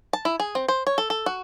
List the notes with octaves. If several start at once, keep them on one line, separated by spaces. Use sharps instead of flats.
A5
E4
G#4
C4
C5
C#5
A4
A4
F#4